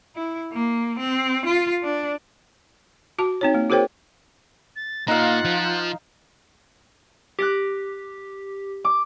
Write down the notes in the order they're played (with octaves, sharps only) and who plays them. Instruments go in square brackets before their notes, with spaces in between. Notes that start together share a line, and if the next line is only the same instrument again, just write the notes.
[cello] E4
A#3
C4
F4
D4
[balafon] F#4 A5
C4 D#4 C#5
A#3
F#4 G#4 A#4 C5 C#5 G5
[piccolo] A6
[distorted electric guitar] A#2 [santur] D#4 F5 [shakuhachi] F4 [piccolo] F#5
[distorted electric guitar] F3
[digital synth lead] G4 [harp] F#6 A#6 D7
[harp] D6